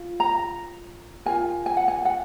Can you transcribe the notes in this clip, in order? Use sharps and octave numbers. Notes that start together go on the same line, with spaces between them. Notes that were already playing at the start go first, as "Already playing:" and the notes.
Already playing: F4
A#5
F4 A#4 G#5
G#5
F#5
G#5
F#5